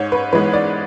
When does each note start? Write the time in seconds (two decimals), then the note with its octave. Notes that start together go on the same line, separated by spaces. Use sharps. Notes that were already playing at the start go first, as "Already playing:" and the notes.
Already playing: G#2 C#5
0.12 B4
0.33 E3 G#3 B3 B4
0.53 D5